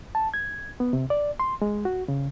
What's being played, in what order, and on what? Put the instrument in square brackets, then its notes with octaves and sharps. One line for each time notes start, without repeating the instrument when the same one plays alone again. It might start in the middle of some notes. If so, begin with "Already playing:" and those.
[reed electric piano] A5
G#6
B3
C3
D5
C6
G#3
F#4
C#3